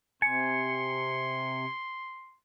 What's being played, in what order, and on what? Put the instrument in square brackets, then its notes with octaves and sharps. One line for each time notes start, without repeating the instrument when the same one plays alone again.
[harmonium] C3 [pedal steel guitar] G#5 [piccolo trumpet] C6 [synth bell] C#7